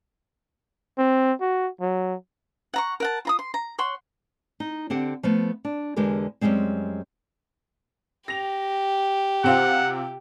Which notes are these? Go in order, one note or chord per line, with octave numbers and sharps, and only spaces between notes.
C4
F#4
F#3
F#5 A#5 C#6
A#4 F#5 A5
F4 A#5 D#6
C6
A#5
C#5 F#5 C6
D#4
D3 C4 G4 F#5
F3 A3 B3
D4
E2 D3 G#3 G4 A#4 B4
F#2 F3 G3 G#3 C4
G4 A#6 F7
C3 C4 F4 F#5